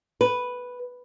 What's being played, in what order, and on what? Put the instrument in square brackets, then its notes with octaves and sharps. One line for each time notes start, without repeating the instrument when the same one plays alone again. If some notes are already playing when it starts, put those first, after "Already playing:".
[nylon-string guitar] B4